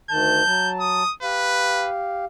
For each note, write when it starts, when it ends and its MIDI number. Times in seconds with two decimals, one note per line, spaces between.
0.10 0.43 38
0.10 0.43 51
0.10 0.43 81
0.10 0.70 91
0.45 1.03 54
0.45 1.03 81
0.80 1.13 87
1.23 2.25 67
1.23 1.90 71
1.23 2.25 77